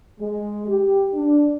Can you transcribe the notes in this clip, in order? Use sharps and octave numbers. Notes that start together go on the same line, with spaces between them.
G#3
G4
D4